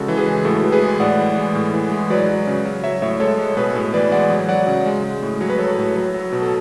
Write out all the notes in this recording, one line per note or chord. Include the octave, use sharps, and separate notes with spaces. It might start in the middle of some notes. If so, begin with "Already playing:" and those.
Already playing: C#3 G#3 F#4 A4
E3
G#4 B4
G#3
A2 F#4 A4
E3
G#4 B4
G#3
A2 D5 F#5
E3
G#3
A2
E3
G#3
F#3 B4 D5
F#3
C#3
F#3
F#3 C#5 E5
A2 C#5 E5
G#3 A4 C#5
G#3
B2 G#4 B4
A2
E3 B4 D5
G#3 D5 F#5
F#3
F#3 D5 F#5
C#3
G#3
G#3
A2
F#3 C#5
B4
F#3 A4 C#5
A2
F#3
F#3
B2
A4